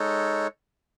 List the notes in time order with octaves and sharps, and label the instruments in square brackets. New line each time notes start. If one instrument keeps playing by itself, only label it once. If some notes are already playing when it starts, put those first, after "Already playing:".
Already playing: [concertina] G#3 D#4 A4 C#5